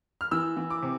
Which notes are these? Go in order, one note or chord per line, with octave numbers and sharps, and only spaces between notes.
F6
E3 E6
E3
D6
C3